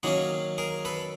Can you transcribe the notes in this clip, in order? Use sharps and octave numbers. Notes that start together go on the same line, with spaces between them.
D#3 F#3 A#3 C#4 F#4 G#4
G#4 A#4
A4 B4